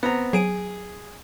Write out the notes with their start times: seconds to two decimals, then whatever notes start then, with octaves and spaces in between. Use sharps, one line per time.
0.03 B3 C4 A#5
0.33 F#3 G#4 D7 D#7